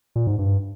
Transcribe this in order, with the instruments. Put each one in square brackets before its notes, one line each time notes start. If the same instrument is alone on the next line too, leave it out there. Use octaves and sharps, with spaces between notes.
[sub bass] A#2
G#2
G2